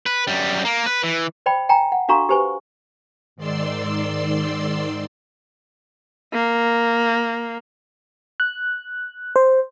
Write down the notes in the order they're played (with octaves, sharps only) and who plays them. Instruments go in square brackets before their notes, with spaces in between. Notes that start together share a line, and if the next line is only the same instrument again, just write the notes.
[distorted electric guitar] B4
F#2 G3
A#3
B4
E3
[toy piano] C5 D5 G5 B5
G5 G#5 A#5
F#5
D4 F#4 A4 F5 A#5 C#6
G4 B4 C5 G#5 C#6
[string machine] G#2 D#3 D5 C6 E6
[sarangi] A#3
[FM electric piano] F#6
C5